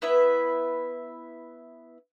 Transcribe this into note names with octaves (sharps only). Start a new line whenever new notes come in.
B3 E4 B4 E5